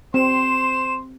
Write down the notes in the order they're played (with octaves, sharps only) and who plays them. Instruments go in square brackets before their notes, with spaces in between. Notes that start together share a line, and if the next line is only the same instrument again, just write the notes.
[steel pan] C4 [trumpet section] C5 C6 [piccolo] E7